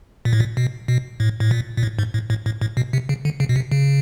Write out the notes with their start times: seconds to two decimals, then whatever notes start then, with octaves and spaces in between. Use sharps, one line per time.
0.25 A#2
0.33 A2
0.40 A#2
0.57 B2
0.88 B2
1.20 A2
1.40 A2
1.51 A#2
1.77 A#2
1.83 A2
1.99 G#2
2.14 A2
2.30 A2
2.46 A2
2.62 A2
2.77 B2
2.93 C3
3.09 C#3
3.25 D3
3.40 C#3
3.49 B2
3.56 C3
3.72 C#3